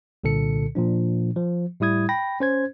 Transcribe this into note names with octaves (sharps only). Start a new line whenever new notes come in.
C2 A#2 D3 A4 C#7
A#2 F3 D4
F3
A2 G3 E4 D#6 G#6
G5 B5 A#6
C#4 C5 G#6